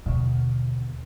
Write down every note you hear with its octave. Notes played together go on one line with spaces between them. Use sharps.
D#2 B2 D3